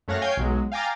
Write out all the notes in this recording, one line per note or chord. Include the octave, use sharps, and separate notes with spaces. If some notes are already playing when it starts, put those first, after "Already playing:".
F#2 A3 C#5 F5 F#5 A#6
C#5 F5 G5 G#5 G6 G#6
B1 F#3 G#3
F5 G5 G#5 A#5 D6 A6